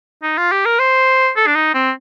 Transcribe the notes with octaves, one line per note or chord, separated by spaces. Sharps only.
D#4
F4
G4
A#4
C5
A4
D4
D#4
C4